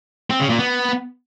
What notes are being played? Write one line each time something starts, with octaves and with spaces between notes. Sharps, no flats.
C4
C#3
A#2
B3